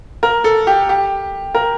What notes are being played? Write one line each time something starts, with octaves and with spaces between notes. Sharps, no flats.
A#4
A4
G4
G4
A#4